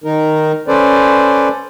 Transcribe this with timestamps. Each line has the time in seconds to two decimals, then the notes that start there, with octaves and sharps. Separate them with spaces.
0.04 D#3 D#4 A#4
0.68 C#4 A4 B4 C5 D5